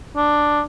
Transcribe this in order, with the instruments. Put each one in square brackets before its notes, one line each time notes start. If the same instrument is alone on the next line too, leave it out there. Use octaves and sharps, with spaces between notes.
[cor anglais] D4